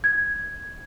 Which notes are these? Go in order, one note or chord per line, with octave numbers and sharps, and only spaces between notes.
G#6